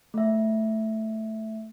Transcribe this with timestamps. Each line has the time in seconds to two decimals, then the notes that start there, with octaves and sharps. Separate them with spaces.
0.14 A3 E5